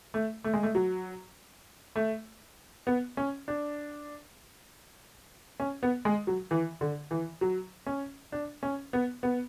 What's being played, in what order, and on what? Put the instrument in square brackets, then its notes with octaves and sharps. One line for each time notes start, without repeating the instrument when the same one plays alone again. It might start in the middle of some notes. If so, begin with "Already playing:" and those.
[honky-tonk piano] A3
A3
G#3
A3
F#3
A3
B3
C#4
D4
C#4
B3
G#3
F#3
E3
D3
E3
F#3
C#4
D4
C#4
B3
B3